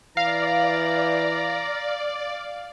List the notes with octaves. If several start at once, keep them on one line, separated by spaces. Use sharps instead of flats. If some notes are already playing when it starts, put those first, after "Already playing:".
E3 D5 F5 A#5